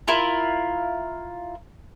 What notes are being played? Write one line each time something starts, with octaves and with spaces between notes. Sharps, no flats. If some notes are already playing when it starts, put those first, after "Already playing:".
E4 F4 A#4